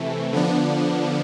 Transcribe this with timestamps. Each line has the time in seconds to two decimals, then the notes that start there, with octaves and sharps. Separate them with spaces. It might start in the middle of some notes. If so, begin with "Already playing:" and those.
Already playing: C3 E3 A3
0.33 D3 F3 B3 D4